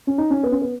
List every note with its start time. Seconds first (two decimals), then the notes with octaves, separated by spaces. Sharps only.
0.07 C#4
0.18 D#4
0.30 C#4
0.43 B3
0.52 C#4
0.62 B3